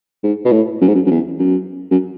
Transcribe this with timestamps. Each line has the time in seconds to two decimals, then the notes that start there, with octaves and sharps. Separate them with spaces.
0.23 G#2
0.45 B2
0.52 A2
0.81 F#2
0.88 G#2
0.95 F#2
1.06 F#2
1.10 E2
1.39 F#2
1.91 F#2